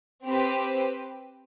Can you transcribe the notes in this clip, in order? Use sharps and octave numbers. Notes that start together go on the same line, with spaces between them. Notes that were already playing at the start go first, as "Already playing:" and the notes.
C4 G4 B4